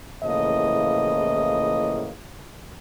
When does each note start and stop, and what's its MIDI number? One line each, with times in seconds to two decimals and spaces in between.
0.24 2.11 40
0.24 2.11 45
0.24 2.11 49
0.24 2.11 53
0.24 2.11 58
0.24 2.11 75